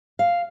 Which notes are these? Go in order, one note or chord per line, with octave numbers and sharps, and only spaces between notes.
F5